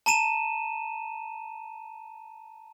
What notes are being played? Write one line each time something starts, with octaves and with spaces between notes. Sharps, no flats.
A5 A#5 D#7 E7